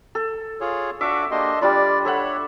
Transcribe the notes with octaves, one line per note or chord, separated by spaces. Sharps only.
A4
F4 G#4 C#5
D4 F#4 E5 C#6 D6
A#3 D4 G4 D#5 C6
G3 D4 F4 D5 B5
A4 C#5 E5 F#5